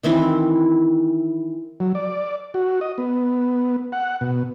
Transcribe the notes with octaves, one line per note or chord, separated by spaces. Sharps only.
D#3 E3 C4 E4
F#3
D5
F#4
D#5
B3
F#5
B2